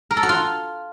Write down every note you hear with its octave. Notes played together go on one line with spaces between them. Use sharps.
A#4
A4
F#4
F4